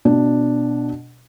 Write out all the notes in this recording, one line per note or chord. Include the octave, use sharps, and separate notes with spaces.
B2 D4